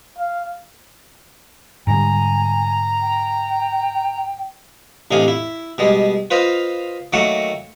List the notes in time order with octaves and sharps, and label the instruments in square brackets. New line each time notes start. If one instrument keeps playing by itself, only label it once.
[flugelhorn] F5
[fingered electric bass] G#2 D3 G3 [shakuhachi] G#5 [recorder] A#5
[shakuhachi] G5
[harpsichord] A1 C3 D4 D#4 F5 G#5
E4
B2 G3 G#3
F4 B4 C5 D#5 F5
D#3 F#3 A3 A#3 F#5 A5